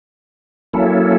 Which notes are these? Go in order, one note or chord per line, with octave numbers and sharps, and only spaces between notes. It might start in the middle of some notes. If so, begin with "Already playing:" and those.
F#3 A#3 C#4 E4 A4